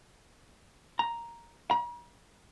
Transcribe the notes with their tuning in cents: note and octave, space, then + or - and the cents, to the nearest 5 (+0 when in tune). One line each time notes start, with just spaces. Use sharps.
A#5 +5
A#5 +45